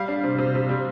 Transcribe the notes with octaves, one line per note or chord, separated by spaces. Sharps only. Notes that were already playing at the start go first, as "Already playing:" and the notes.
Already playing: G3 F5
D4
C3
C3
C3
G3